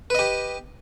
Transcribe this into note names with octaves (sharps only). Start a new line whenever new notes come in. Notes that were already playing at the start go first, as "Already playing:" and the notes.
G4 B4 D#5